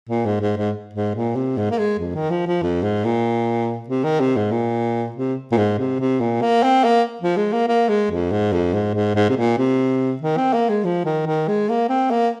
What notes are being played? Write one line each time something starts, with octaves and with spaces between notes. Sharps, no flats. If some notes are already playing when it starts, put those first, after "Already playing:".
A#2
G#2
G#2
G#2
G#2
A#2
C3
G#2
A#3
G#3
F2
D#3
F3
F3
F2
G#2
A#2
C3
D#3
C3
G#2
A#2
C3
A#2
G#2
C3
C3
A#2
A#3
C4
A#3
F3
G#3
A#3
A#3
G#3
F2
G#2
F2
G#2
G#2
G#2
C3
A#2
C3
D#3
C4
A#3
G#3
F3
D#3
D#3
G#3
A#3
C4
A#3